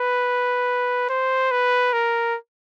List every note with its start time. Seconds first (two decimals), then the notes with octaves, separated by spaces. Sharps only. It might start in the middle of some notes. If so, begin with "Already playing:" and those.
Already playing: B4
1.10 C5
1.51 B4
1.93 A#4